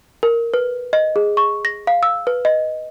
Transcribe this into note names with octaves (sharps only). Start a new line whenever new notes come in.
A#4
B4
D#5
G#4
C#6
A#6
F5
E6
B4
D#5